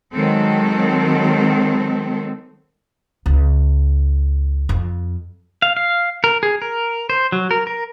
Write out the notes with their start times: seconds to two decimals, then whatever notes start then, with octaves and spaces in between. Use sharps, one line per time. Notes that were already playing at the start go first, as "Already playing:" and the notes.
0.14 D#3 F#3 G#3 C4 A4
3.26 C#2
4.69 F2
5.62 F5
5.77 F5
6.24 A#4
6.43 G#4
6.62 A#4
7.10 C5
7.32 F#3
7.51 A#4
7.67 A#4